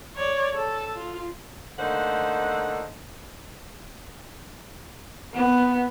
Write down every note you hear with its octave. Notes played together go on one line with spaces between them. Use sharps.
C#5 D5
A4 A5
F4
D3 A3 A#3 D#4 C5 F#5
B3